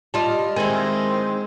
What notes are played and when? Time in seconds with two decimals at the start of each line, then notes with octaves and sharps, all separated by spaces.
0.14 G3 F4 D#5 A5
0.56 D#3 G#3 C4 E4 G#5